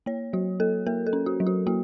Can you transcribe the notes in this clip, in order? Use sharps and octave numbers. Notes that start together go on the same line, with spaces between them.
A#3 C#5
F#3 F#4
A#3 A4
A#3 A#4
A4
C#4
F#4
F#3
F#4
A#3 F#4